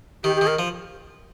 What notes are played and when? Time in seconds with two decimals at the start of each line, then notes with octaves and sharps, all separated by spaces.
0.24 D#3 G4
0.36 G4
0.41 D#3
0.47 A#4
0.59 F3